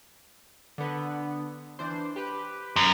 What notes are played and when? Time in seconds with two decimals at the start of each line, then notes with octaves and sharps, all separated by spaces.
0.78 D3 B3
1.79 E3 D4 C5
2.16 G4 B4
2.76 F#2